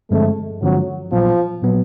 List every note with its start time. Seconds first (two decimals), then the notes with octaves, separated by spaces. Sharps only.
0.11 G2 D3 F3 G#3 A3 C4
0.62 G2 D3 F3 F#3 G#3 C4
1.12 A#2 F3 F#3 B3
1.62 A#2 F#3 B3